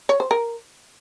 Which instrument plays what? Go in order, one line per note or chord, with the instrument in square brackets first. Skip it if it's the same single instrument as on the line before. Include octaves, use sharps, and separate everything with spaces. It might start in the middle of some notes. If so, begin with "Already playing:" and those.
[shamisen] C#5
C5
A#4